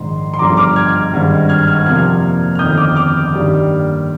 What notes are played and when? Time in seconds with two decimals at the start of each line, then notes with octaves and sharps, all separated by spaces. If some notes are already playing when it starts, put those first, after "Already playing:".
Already playing: A#1 G#2 D#3 C6
0.34 C6
0.39 G1 G2 F3 A#5 D6
0.57 D6 F6
0.76 F6 G#6
1.13 G#1 G2 D#3 G#3
1.49 F6 G#6
1.67 F6 G#6
1.86 F2 C3 F3 A#3 F6 G#6
2.55 F6
2.59 G1 F2 D#3 D#6 G6
2.77 D6 F6
2.96 D6 F6
3.33 G2 D#3 G3 A#3